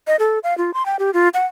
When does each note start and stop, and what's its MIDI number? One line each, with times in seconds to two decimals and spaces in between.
0.07 0.16 75
0.19 0.39 69
0.44 0.56 77
0.58 0.74 65
0.74 0.86 84
0.86 0.96 79
0.99 1.11 67
1.14 1.29 65
1.34 1.45 78